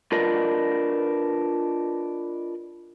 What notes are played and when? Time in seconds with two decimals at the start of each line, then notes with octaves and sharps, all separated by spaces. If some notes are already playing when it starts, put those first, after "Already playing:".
0.12 D4 F4 A#4 B4 D5 D#5